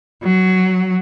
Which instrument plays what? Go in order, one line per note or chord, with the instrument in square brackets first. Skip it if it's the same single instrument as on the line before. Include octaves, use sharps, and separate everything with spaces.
[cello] F#3